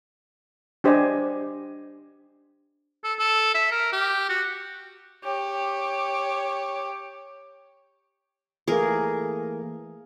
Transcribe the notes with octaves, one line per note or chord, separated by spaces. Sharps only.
D4 G4 C5 D5 D#5 G#5
A4
A4
E5
A#4
G4
F#4
G4 C#5
E3 A3 A#3 G#4 A#4